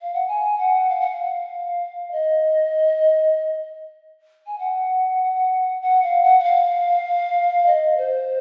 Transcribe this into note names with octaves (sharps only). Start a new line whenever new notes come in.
F5
F#5
G#5
F#5
F5
F#5
F5
D#5
G#5
F#5
F#5
F5
F#5
F#5
F5
D#5
C5